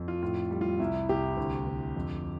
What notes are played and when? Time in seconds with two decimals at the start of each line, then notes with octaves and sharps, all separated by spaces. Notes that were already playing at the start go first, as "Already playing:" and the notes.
Already playing: F2
0.08 F4
0.23 A2 F4
0.51 G3
0.61 F4
0.79 C2 E4
1.09 C2 G4
1.37 D2
1.67 D2
1.96 F2